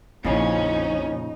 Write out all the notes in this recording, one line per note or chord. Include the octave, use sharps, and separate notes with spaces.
A#1 F2 A#2 C#3 C#4 D#4 E4